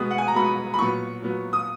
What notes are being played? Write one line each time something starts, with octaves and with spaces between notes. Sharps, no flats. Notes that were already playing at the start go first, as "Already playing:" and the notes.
Already playing: B2 G#3 B3 D#6
F#5
G#5
A#5
B2 G#3 B3 B5
B5
A#2 F#3 B3 C#6
A#2 F#3 B3
D#6